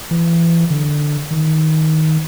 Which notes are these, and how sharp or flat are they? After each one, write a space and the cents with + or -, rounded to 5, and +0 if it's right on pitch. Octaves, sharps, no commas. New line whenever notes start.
E3 +30
D3 +10
D#3 +15